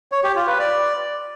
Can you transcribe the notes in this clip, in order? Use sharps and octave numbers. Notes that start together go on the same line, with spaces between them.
C#5
G4
F4
B4
D5